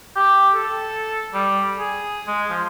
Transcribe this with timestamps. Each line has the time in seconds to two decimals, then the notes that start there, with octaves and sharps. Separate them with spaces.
0.16 G4
0.55 A4
1.34 G3
1.79 G#4
2.27 G#3
2.50 F3